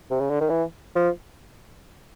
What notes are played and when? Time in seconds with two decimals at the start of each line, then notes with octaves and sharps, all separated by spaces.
0.10 C3
0.20 C#3
0.30 D3
0.40 D#3
0.49 E3
0.95 F3